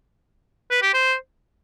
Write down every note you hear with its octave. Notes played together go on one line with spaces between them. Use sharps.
B4
G4
C5